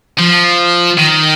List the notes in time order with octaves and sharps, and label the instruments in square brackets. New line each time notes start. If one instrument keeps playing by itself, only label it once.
[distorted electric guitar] F3
D#3